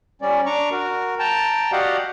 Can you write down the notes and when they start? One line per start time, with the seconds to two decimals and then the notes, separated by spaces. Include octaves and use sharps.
0.22 G3 C#4 D5
0.46 D4 A#5 C#6 D6
0.72 F#4 A#4
1.19 G5 A5 A#5
1.72 F#4 G4 D5 D#5 F5 F#5